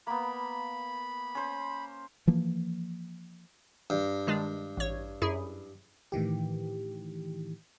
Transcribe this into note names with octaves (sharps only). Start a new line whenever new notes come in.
A#3 B3 B5
C#4 C5
E3 F3 A#3
G2
D#3 G#3 D4
A1 C#5
F#2 E4 G#4
A2 D#3 E3 G4